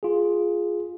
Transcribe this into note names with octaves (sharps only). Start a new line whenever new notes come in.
F4 G#4